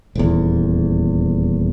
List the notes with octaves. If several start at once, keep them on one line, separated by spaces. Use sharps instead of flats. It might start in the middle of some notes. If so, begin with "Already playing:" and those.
D#1 E2